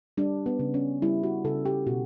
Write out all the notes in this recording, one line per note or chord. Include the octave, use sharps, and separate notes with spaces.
G3 D4
B3
C#3
C#4
G3 E4
F#4
C#3 A4
G4
B2 F#4